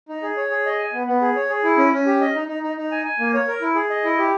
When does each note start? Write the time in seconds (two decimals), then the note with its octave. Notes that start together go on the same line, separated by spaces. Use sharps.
0.09 D#4
0.23 G#4
0.37 C#5
0.51 G#4
0.66 D#5
0.79 G#5
0.93 B3
1.07 B3
1.21 G#4
1.36 C#5
1.49 G#4
1.64 E4
1.78 C#4
1.92 C#4
2.06 G4
2.21 D#5
2.35 D#4
2.48 D#4
2.63 D#4
2.78 D#4
2.92 G#5
3.05 G#5
3.19 A#3
3.34 C#5
3.48 A#4
3.62 E4
3.75 G#4
3.90 D#5
4.04 E4
4.18 G4